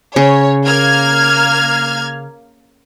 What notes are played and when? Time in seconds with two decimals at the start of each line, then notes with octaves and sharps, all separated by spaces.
0.16 C#3 C#5
0.65 A#3 F6 G#6